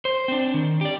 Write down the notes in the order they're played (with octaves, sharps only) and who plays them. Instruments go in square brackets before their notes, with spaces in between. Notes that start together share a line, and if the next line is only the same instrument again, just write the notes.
[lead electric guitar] C5
C4 D4
D#3
G4 D5